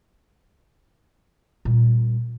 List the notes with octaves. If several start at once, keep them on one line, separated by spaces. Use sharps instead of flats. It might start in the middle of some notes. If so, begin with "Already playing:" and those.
A#2 G3